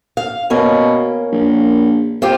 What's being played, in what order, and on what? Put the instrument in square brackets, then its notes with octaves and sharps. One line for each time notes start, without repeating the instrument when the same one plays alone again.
[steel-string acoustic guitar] F5
[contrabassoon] B2 [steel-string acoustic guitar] A#3 C#4
[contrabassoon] A#1
[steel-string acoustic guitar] C4 F4 G4